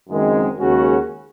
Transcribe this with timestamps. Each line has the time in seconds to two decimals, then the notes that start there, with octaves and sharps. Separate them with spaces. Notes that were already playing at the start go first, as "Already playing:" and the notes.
0.09 F#1 F#2 D#3 G#3 C4
0.59 D#2 C#3 G#3 C#4 F#4